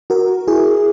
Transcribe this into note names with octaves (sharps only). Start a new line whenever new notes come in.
F#4 A#4
E4 G#4